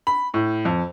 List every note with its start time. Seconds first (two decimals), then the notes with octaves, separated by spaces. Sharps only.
0.07 B5
0.34 A2
0.65 F2